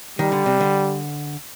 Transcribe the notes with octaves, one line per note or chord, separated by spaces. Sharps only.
D#3 G3
D3
C3
D3